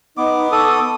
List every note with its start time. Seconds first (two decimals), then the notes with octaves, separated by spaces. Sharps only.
0.17 B3 D#4 B4 D#5 D6
0.52 A4 A5 C#6 D#6 E6